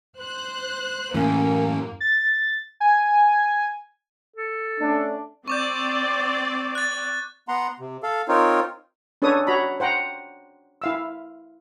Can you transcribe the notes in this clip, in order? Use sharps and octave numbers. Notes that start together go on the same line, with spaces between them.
C5 F#6
F#2 A2 E3 A#3 C#4
A6
G#5
A4
A3 C#4 D4
C4 D5 C#6 D6 G6
F#6 A6
B3 F#5 A#5 C6
C3
A4 F5
C4 D#4 F4 A#4 C#5
C#4 D4 A4 B4 C#5 D#6
F#4 C#5 A#5 B5
C5 F#5 G5 A#5
E4 F5 E6